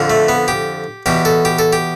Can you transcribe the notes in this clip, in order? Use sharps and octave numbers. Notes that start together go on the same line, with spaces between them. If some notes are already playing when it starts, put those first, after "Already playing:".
Already playing: F2 D3 F3
A3
B3
G4
E2 B2 G4
A4
G4
A4
G4